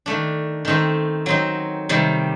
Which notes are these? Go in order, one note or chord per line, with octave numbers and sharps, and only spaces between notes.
D#3 A3 D4
D#3 A3 C4 D#4
F#3 C4 D#4
C3 D#3 G3